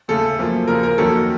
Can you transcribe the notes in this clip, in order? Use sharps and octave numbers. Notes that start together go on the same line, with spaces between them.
D#2 C#3 A3 A4
F#2 F3 A#3
D#2 C#3 F3 A#4
A#4
F2 D#3 F#3 A#3 C#4 A4